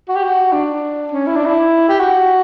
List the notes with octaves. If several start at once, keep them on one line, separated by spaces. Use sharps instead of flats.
F#4
G4
F#4
D4
C#4
E4
D4
E4
G4
F#4